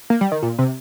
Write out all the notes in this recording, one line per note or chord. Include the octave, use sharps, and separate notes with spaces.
A#3
G3
D#3
A#2
C3